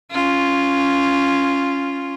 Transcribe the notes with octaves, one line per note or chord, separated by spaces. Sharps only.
C#4 F4